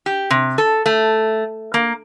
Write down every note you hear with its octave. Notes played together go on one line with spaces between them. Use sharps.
G4
C3
A4
A3
A#3